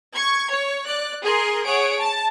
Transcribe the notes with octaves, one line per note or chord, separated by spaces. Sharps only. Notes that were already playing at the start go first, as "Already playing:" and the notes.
C#6 G#6
C#5
D5 F#6
G#4 A#4 C6
G#4 C#5 F#5 D7
A5